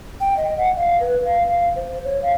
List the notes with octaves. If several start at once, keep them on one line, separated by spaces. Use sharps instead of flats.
G5
D#5
F#5
F5
B4
F5
F5
C5
C#5
F5